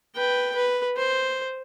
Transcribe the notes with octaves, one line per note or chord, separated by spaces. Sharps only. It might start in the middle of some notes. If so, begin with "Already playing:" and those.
B4 G5
B4
C5